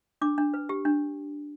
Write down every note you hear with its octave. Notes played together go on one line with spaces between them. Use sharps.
D4 D6
D4
B4
G4
D4